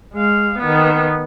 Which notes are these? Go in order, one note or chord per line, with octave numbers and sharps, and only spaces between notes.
G#3 F5
D#3 B3